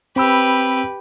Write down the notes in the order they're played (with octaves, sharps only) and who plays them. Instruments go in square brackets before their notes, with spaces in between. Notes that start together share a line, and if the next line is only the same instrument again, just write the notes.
[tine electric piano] C4 B5 E6 [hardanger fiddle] G4 B4